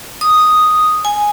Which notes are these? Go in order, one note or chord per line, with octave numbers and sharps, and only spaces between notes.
D#6
G#5